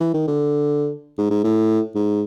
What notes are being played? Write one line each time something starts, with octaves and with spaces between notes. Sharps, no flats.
E3
D#3
D3
G#2
G#2
A2
G#2